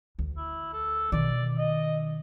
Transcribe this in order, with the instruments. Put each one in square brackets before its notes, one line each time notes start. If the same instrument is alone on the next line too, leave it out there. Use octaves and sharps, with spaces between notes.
[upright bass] D2
[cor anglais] E4
A4
[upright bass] B2 D#3 [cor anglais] D5
[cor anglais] D#5